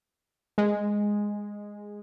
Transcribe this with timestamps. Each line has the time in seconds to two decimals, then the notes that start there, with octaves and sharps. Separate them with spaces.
0.58 G#3